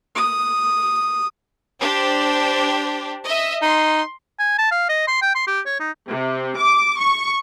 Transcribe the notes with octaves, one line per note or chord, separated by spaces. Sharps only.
D#6
D4 G4 C5
D#5 E5
D#4 C6
G#5
A5
F5
D#5
C6
G5
C6
G4
C#5
D#4
C3
D6
C#6